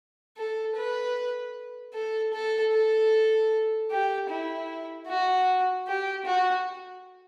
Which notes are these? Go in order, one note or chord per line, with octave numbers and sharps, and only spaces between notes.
A4
B4
A4
A4
A4
G4
E4
F#4
G4
F#4